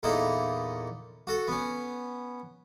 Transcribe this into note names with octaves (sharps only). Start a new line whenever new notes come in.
E2 A#2 D#4 E4 A4
F#4 A4
B3 C#4